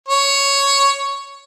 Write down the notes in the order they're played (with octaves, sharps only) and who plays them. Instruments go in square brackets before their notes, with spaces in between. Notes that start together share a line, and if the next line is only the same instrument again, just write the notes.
[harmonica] C#5